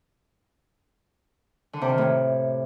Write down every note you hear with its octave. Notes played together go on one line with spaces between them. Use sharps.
D3
C3
D#3
A2